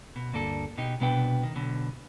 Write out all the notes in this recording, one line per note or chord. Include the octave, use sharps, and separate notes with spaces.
B2
D2 G2 A#3 D4 A4
B2 D#4 G4
C2 B2 B3 D4 B4 G5
D#3
B1 B2 D3